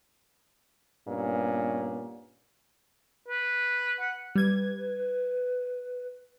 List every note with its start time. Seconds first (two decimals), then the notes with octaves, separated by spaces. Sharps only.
1.07 G2 A#2 B3 C#4
3.28 B4
4.00 F#5
4.35 G3 B4 G#6